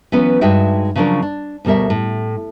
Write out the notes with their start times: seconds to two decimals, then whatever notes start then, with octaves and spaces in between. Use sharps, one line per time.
0.12 E3 F#3 B3 C#4
0.41 G2 G#3 D#4 F#4 E5 G5
0.96 C#3 F3 F#3 D4 A#4
1.22 D4
1.65 D2 B2 G3 A#4 E5
1.90 A2